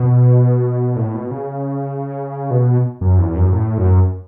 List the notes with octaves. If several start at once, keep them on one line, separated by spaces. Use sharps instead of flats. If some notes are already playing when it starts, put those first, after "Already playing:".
Already playing: B2
A2
B2
C#3
B2
F#2
E2
F#2
A2
F#2